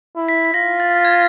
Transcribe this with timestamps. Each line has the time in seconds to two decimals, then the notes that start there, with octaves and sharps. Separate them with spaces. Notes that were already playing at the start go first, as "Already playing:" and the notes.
0.16 E4
0.29 B6
0.45 B6
0.54 F4 A#6
0.80 A6
1.05 G#6